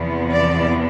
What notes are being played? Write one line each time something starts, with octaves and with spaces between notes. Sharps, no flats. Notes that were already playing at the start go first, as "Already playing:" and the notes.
Already playing: E2 C3 F3 B3
D5